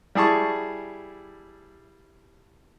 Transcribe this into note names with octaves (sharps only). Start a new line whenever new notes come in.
G3 E4 G#4 A5 C#6